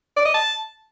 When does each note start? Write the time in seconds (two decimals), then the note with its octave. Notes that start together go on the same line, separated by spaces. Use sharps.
0.17 D5
0.25 D#5
0.34 A5